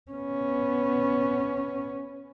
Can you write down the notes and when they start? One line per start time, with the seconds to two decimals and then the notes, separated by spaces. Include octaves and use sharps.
0.11 B3 C#4